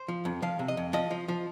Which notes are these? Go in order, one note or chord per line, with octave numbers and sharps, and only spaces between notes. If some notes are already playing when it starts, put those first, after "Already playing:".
Already playing: C5
F3
F2
F3 F5
C3
D#5
F2
F3 D#5
F3
F3